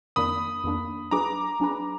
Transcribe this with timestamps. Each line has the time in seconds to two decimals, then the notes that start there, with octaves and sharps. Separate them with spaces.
0.16 F2 D#3 A#3 D4 B5 D#6
0.64 F2 D#3 A#3 D4
1.11 F#3 D4 G#4 B4 A#5 D6
1.60 F#3 D4 G#4 B4